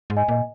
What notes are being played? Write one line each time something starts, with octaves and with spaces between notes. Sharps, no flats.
G#2
D#5 G#5
A#2 D#5